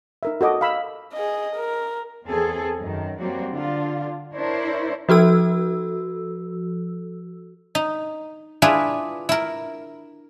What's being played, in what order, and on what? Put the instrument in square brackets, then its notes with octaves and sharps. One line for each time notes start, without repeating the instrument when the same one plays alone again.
[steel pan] D#4 A#4 E5
F#4 A4 D#5 D6
F5 B5 E6
[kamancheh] G#4 D#5
A#4
[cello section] E2 C4 G#4 A4
F#2 D#3
F#3 G3 A#3 C4 F#4
D3 D4 F4
D4 E4 A#4 C5 C#5
[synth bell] F3 F#4 A4 E6
[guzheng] D#4
D4 E4 F4 G#4 B4
E4 A#4